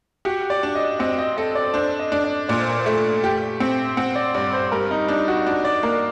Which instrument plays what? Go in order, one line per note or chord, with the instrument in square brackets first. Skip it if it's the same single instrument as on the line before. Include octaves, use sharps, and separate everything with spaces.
[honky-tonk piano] F#4 [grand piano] G4
[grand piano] D5
[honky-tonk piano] D4
[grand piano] D#5
[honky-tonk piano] C4 [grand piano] D#5
[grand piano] D#5
[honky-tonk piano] A4 [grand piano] D#5
[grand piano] D5
[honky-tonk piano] D4 [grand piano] C5
[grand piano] D#5
[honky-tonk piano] D4
[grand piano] D5
[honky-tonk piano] A#2 [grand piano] D5
[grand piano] C5
A#4
C5
[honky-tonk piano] A3
G4
C4
[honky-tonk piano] C4 [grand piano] F#5
[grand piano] D5
[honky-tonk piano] G2 [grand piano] D5
[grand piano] C5
[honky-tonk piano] G3 [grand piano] A#4
[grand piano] D#4
[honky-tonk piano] D4 [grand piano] D#4
[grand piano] F#4
[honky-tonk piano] D4 [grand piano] F#4
[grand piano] D5
[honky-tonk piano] A#3 [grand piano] A#4